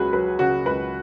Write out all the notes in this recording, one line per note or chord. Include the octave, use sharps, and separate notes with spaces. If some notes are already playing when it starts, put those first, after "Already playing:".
Already playing: C#2 F#3 F#4 G#4 B4
F#3 B4
C#3 F#4
C#2 B4